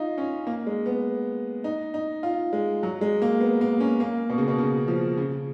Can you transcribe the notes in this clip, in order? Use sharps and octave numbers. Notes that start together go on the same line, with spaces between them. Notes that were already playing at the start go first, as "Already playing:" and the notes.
Already playing: D#4 F4
C#4
A#3
G#3
B3
D#4
D#4
F4
G#3
F#3
G#3
A#3
B3
A#3
C#4
A#3
B2
C#3
B2
C#3
F3
C#3